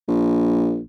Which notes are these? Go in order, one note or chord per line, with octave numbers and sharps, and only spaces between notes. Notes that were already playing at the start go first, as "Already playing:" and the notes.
A#1